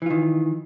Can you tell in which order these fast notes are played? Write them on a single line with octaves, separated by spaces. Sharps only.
E3 F4 D#3